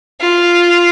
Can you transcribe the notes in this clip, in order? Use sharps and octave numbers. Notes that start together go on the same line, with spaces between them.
F4